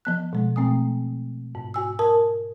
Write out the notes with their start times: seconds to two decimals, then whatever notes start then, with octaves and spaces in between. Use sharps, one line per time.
0.05 F3 B3 F#6
0.33 B2 G#3
0.56 B2 A3 C4 G#5 D#6
1.55 G#2
1.74 F#4 G#5 E6
1.99 A#4 A5 D#6